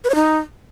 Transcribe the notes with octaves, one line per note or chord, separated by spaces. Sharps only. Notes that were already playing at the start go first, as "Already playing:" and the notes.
B4
C#5
D#4